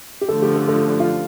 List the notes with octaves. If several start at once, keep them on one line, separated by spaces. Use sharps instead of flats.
G4
D3 F3 A3 A4
G4
A4
A4
F4